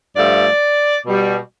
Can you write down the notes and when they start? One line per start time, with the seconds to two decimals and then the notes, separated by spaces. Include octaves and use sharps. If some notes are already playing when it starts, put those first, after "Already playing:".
0.16 G2 F3 A3 D5
1.05 B2 G3